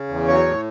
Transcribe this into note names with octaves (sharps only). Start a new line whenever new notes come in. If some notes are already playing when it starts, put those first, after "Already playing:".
Already playing: C#3
E2
F#3 C#5
A2